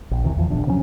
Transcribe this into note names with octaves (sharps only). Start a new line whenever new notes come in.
A#1
D#2 C3 E3
E2 E3 F3
D#1 A#1 E2 D4
C3 F3 F#3 C#4